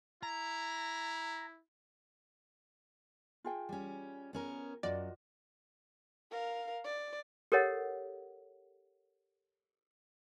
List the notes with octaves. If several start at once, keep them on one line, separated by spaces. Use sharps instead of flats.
E4 A#5
F4 G#4 G5
G3 C#4
B3 C#4 A#4
F#2 F4 F#4 D5 D#5
A#4 F5
D5
G4 A4 A#4 C#5 D#5 F#5